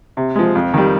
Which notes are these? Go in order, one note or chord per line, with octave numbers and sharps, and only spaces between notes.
C3
F3 G#3
F2
D#3 G3